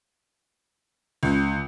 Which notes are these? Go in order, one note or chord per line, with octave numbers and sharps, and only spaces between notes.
C#2